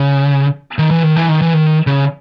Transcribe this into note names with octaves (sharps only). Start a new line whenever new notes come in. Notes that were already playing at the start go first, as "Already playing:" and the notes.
Already playing: C#3
D#3
E3
D#3
E3
D#3
E3
D#3
C#3